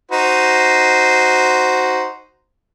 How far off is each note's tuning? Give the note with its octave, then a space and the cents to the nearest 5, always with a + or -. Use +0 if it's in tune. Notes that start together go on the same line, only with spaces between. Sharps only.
D#4 +0 F#4 +0 C5 -5